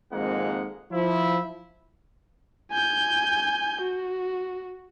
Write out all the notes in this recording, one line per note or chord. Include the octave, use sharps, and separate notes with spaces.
G#1 F2 G#2 G#3 A#3 F#5
F3 E4
G#5 G6
F#4